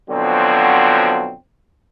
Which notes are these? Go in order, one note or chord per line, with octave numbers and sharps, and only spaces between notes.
B2 D3 F3 F#3 C4